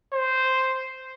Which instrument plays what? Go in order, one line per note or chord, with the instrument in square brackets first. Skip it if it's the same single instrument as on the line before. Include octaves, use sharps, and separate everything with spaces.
[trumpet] C5